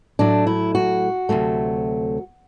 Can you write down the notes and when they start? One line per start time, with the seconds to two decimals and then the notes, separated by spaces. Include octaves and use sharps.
0.19 A2 F#3 A3 D4
0.47 E4
0.75 F#4
1.29 D2 C3 F#3 A3